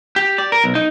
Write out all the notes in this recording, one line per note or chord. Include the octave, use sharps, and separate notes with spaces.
G4
D5
A#4
B1
D#4